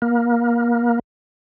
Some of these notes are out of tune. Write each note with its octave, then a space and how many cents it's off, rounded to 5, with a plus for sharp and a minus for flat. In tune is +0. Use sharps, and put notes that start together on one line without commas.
A#3 +25